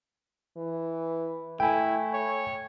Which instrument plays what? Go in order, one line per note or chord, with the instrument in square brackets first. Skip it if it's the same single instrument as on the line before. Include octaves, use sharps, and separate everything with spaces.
[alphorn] E3
[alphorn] A3 [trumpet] E4 [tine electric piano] G5 G#5
[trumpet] C#5